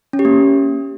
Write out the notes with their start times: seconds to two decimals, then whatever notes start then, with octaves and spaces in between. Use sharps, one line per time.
0.13 C#4
0.19 G4
0.25 A#3